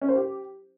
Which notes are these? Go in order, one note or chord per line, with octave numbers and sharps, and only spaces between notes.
C#4
C5
G4